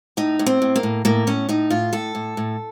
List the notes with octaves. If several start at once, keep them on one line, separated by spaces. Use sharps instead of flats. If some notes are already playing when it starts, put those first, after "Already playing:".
A2 D#4
A2
C4
A2
A#3
A2
A2 A#3
A2 C#4
A2 D#4
A2 F4
A2 A4
A2
A2